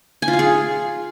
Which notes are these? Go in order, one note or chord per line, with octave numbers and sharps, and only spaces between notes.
G#5
F4
F5
G#4